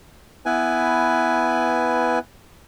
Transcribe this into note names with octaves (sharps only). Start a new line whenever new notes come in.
B3 E4 B4 G#5